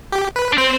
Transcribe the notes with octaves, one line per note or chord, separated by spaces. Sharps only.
G4
B4
D4
C4 C5